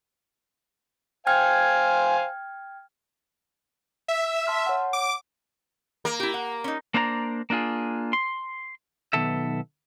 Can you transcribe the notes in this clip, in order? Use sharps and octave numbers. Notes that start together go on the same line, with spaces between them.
C5 F5 G5 G#5 F6 G#6
E5
A5 C6 F6
C#5 F#5
D6
A#3
E4 G4
F#5
C#4 D#4
A#3 D4 C5 D5 F5 A#5
A#3 D4 F4 G#4
C6
B1 E2 D#3 B3 A4 E5